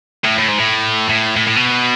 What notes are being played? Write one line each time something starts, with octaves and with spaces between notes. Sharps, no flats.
A2
A2
G#2
A2
A2
A2
A2
B2